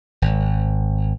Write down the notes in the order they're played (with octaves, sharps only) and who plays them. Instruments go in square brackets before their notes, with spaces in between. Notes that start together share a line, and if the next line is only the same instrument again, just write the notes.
[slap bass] G#1